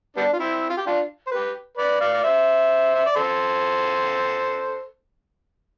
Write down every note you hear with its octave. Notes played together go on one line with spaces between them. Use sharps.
G3 B3 D4
F4
C4 E4
F4
G4
D4 F4
C5
G4 B4
B4 D5
D5 F5
D5
C5 E5
E5
D5
A4 C5